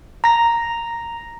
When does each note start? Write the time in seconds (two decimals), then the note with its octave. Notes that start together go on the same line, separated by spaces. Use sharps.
0.24 A#5 A#6